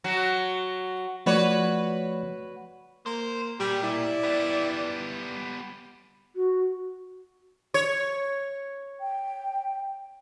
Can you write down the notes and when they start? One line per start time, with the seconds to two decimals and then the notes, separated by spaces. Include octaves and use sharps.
0.04 F#3 F#4
1.26 F3 A3 F#4 B4 C#5 D5
3.06 A#3 C5
3.60 A#2 G3 G4
3.83 E4 D5
4.23 G3 B3
6.36 F#4
7.74 C#5
9.01 G5